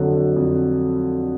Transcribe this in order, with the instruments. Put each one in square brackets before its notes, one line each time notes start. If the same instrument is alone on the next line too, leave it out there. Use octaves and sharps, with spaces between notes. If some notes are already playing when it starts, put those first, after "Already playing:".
Already playing: [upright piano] F2 D3 F#3
F2